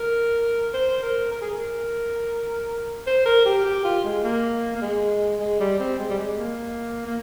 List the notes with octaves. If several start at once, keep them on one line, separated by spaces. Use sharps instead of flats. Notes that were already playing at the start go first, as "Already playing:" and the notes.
Already playing: A#4
C5
A#4
A#4
G#4
A#4
C5
A#4
G4
G4
F4
G#3
A#3
A#3
G#3
G#3
G3
C4
G#3
G3
G#3
A#3
A#3